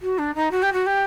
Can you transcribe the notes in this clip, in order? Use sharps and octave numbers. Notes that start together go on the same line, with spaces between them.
F#4
D4
D#4
F#4
G4
F#4
G4